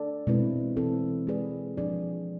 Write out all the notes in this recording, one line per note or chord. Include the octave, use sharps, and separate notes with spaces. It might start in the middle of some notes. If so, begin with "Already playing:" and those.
Already playing: D4 A4 D5
B2 G#3 C4 E4 B4
E3 G#3 C4 E4 A4
G#3 C4 G#4 B4 D5
F3 G#3 D4 G#4 D5